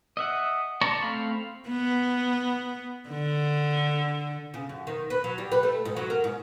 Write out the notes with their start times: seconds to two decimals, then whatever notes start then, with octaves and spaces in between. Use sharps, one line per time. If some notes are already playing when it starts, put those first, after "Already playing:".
0.17 D#5 E5 F#5
0.81 D5 A5 A#5 C6 C#6
1.02 A3 C4 C5 F5 B5
1.68 B3
3.09 D3
4.54 C#3
4.69 F#2
4.87 D#3
5.10 B4
5.24 F#3
5.38 G3
5.52 B4
5.63 A3
5.85 G#2
5.97 F#3
6.10 A#4
6.24 G#2